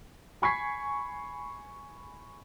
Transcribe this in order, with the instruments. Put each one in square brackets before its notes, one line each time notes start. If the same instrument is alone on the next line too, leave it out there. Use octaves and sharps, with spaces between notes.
[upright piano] G#5 B5 C#6 G#6 B6 C7